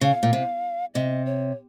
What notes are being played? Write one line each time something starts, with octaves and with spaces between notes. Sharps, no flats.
C#3 F5
A#2
C3
C3 D#5
C#5